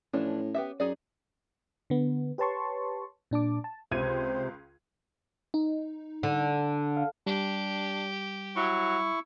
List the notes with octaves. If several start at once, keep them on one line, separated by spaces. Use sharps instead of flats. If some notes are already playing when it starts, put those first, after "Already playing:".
A2 E3 F3 C#4 D4
B3 G4 E5
F#2 D#4 G#4 D5
D3 B3
G4 B4 C#5 A5 C6 C#6
A#2 D4 A5 D6
A5
C#2 C3 C5 G#6 D#7
D#4
D3
F5
G3 D4 G4
F#3 E4 C#6